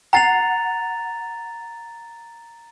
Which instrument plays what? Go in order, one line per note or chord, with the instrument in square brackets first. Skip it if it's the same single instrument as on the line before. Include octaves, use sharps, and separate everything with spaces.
[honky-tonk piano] F#5 C7 [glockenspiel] A#5 A6 F7